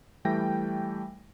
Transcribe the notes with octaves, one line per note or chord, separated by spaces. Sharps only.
E3 G3 A3 G5 A#6